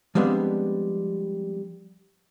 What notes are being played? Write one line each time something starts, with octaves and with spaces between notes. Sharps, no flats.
F3 G3 G#3 B3 C4 D4